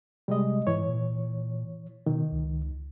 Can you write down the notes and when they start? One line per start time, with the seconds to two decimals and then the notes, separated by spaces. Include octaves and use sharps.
0.28 C3 G3 G#3 D#5
0.67 G#2 E3 C#5
0.88 A#2
2.06 B2 D#3
2.32 C#2